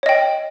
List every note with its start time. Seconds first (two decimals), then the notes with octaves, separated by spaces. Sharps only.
0.03 C#5
0.06 D#5
0.09 G5